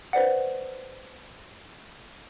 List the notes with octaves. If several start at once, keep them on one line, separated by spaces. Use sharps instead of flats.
B4 C5 D5 F#5